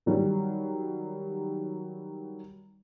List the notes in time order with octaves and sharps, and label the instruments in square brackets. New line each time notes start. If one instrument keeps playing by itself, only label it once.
[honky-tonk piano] D#3 F#3 G3